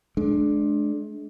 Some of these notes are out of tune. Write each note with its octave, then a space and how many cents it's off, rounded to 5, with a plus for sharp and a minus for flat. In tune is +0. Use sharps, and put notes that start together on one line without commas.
G#3 +40 D4 +5